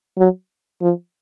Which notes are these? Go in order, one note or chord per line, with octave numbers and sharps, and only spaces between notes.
F#3
F3